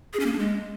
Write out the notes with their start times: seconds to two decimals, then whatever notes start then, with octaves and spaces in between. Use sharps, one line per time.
0.13 G#4
0.20 C#4
0.26 A#3
0.32 D4
0.39 G#3